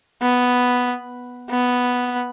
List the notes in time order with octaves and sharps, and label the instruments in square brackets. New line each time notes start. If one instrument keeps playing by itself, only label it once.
[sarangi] B3
B3